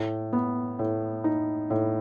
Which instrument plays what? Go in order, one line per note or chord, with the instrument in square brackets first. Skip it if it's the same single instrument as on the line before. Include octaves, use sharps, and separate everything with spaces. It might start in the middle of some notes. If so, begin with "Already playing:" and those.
Already playing: [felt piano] A2
B3
A2
D#4
A2